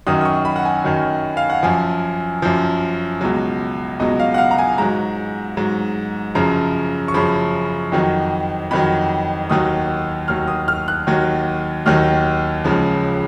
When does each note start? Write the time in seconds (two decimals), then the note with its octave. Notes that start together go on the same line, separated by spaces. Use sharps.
0.07 F#2 D#3 F#3 D#6
0.21 D#6
0.25 C#6
0.45 B5
0.56 F#5
0.65 G#5
0.84 F#2 D#3 F#3
1.37 F5
1.50 F#5
1.63 F#2 F3 G#5
2.42 F#2 F3
3.21 C#2 B2 F#3
3.99 C#2 B2 F#3 D#5
4.20 F5
4.34 F#5
4.38 F5
4.51 A#5
4.58 G#5
4.78 G#2 F#3 A#5
5.57 G#2 F#3
6.35 F#2 C#3 F3 A#5
7.08 C#6
7.14 F#2 C#3 F3 B5
7.92 F2 D#3 F#3
8.71 F2 D#3 F#3 B5
9.50 D#2 D#3 F#3 D#6
10.28 D#2 D#3 F#3 F6
10.48 D#6
10.68 F6
10.88 F#6
11.07 D#2 D#3 F#3
11.86 D#2 D#3 F#3 F6
12.64 C#2 C#3 F3